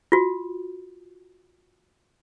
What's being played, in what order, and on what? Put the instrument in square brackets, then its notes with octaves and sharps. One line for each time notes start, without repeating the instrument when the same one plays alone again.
[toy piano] F4 F#4